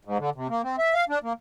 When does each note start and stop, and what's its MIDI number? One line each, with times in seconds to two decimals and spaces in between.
0.05 0.18 44
0.19 0.30 50
0.35 0.47 48
0.49 0.62 58
0.64 0.76 60
0.78 0.94 76
0.94 1.05 77
1.09 1.19 62
1.23 1.33 58